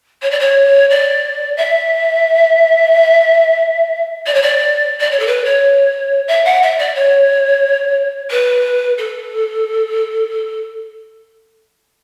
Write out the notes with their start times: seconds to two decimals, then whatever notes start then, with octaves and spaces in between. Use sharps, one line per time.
0.22 C#5
0.31 D5
0.40 C#5
0.90 D5
1.57 E5
4.26 D5
4.34 C#5
4.42 D5
5.00 D5
5.11 C#5
5.19 A4
5.27 B4
5.45 C#5
6.28 E5
6.45 F#5
6.62 E5
6.78 D5
6.95 C#5
8.31 B4
8.98 A4